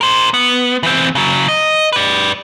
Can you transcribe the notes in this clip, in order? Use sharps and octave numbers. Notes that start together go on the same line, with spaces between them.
A#4 C5
B3
E3 C4
C#3 F#3
D#5
B4 D5